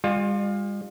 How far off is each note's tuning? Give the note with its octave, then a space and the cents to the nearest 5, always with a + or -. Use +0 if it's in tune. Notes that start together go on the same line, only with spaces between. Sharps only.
G3 +45 F4 +15